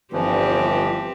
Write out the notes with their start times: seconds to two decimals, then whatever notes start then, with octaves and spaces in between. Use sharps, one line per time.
0.13 G1 E3 F3 C4 G4